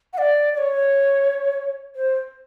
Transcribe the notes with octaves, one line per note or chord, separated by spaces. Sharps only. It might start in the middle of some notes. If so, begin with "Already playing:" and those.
F#5
D5
D5
C#5
C5